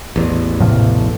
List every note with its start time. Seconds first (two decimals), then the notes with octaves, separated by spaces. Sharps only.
0.16 A1 E2
0.60 A2 C3 F3